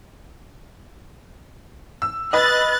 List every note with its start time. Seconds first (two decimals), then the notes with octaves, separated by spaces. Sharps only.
2.02 E6
2.33 B4 D#5 F#6 A6